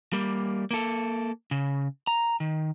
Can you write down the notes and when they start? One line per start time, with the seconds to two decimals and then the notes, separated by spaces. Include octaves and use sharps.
0.13 G3 A#3
0.71 A#3 A4
1.51 C#3
2.07 A#5
2.40 D#3